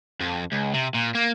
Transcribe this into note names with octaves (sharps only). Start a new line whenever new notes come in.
F2
C#2
C3
A#2
A#3